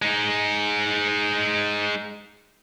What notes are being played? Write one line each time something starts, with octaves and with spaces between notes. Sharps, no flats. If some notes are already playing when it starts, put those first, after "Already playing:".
G#3 D#4